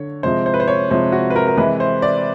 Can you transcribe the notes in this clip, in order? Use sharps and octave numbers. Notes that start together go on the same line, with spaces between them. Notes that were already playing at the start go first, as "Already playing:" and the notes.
Already playing: D3 C#5
C3 F3 G#3 C5
C5
B4
C5
C#5
C3 F3 G#3 C5
F#4
B4
A#4
A#4
C3 E3 G#3 B4
C5
D5